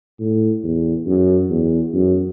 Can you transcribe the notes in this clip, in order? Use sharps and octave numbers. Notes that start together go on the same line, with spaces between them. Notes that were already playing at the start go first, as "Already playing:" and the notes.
A2
E2
F#2
E2
F#2